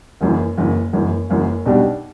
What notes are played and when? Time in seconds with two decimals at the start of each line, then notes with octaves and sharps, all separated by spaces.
0.21 F#1 F#2 E3
0.58 F#1 F#2 E3
0.93 F#1 F#2 E3
1.30 F#1 F#2 E3
1.66 B1 B2 G3 D4 G4